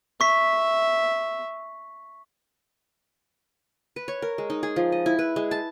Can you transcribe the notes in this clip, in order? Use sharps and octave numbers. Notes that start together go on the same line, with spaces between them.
E5 C#6 B6
B4
C#5
A#4
G#3
D#4
G#4
F3
D#5
E4
B4
G#3
A5